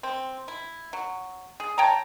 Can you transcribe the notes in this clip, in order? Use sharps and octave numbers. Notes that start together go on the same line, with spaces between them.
C4
E4
F#3
G#4
C#5 G5 A5 A#5